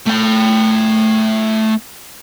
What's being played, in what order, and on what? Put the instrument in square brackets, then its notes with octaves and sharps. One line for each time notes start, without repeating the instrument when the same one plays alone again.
[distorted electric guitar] A3 G5